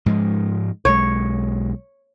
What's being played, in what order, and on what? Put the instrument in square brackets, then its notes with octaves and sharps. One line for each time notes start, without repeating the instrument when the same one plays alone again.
[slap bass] G#2 F3 G#3
[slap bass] B1 G#3 [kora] C#5